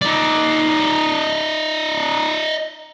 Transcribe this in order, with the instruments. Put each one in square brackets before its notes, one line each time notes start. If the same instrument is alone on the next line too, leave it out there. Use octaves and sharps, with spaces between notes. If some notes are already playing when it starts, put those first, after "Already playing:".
[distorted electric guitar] D#4 D5